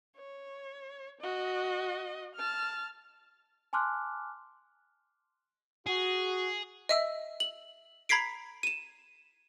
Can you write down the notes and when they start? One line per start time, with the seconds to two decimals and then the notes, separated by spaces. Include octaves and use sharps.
0.17 C#5
1.21 F#4 D#5
2.35 A5 F6
3.73 G#5 A5 C6 D6 F6 F#6
5.86 F#4 G#4
6.89 D#5 E5 E6
7.40 F#7
8.09 A#5 B5 G#6 B6 C7 D7
8.63 D#7 E7